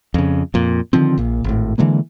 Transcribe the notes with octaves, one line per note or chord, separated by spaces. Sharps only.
F2 C#3
F2 A#2
D3 D#3 F3 C4
A#1 A#2
G#1 A2
D3 E3 G#3 A#3